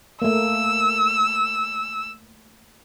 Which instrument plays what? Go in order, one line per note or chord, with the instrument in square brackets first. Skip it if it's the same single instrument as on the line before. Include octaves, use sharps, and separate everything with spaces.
[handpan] A3 A#3 [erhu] E6